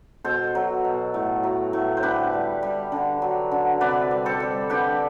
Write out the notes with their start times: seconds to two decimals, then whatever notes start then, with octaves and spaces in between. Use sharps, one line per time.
0.24 B2 A4 C5
0.55 F#3
0.84 B2
1.14 A2
1.43 F#3
1.73 A2
1.97 C5
2.03 D3 G4 B4
2.33 G3
2.63 G3
2.92 D3
3.22 F#3
3.51 D3
3.81 C3 B4 D5
4.11 G3
4.26 A4 C5
4.40 G3
4.70 D3 G4 B4